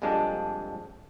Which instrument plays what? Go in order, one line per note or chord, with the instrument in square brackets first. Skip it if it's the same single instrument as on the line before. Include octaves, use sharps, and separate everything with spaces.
[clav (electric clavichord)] A#1 F2 G3 G#3 D4 A4